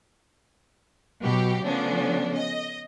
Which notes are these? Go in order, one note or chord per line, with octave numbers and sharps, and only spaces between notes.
B2 F#3 G4
C#3 F3 A3 B3 C#4 D4
D#5